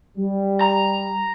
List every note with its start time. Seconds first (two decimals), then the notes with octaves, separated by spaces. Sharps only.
0.17 G3
0.61 A#5